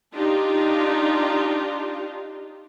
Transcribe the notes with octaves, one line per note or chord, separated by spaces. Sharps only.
D4 D#4 F4 G4